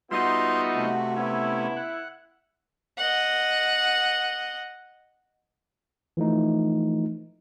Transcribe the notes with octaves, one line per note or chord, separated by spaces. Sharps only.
G3 B3 D#4 F4 F#4 E5 C6
C3 A3
B3 C#4 E4
F#5
D#5 F#5
E3 F3 A3 D#4